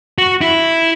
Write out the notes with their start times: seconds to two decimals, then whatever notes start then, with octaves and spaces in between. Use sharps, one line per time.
0.18 F#4
0.41 E4